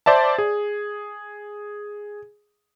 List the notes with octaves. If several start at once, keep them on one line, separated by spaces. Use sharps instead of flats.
C5 D5 E5 A5
G#4